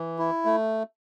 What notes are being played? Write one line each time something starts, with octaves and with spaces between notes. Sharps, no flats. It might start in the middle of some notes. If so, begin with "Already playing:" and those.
Already playing: E3
E4
A3